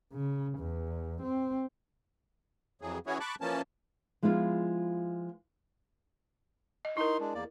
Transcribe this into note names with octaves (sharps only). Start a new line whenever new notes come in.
C#3
E2
C4
F2 E3 F#3 G#4
E3 C#4 E4 F#4 G#4 C#5
A5 B5 C#6 D6 F#6
E3 F3 A#3 C#4 A5
F3 G#3 B3 E4 F4
D#5
D#4 E4 A#4 C6
G#3 D4
E2 A#3 D5